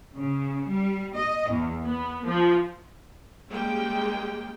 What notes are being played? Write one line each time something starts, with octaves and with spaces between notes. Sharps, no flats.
C#3
G3
D#5
E2
B3
F3
G3 G#3 A#3 C#4 G5